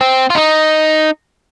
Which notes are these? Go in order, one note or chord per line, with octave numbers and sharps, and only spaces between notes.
C4
F4
D#4